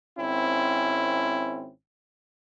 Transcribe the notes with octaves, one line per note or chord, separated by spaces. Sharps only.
G#1 C4 C#4 E4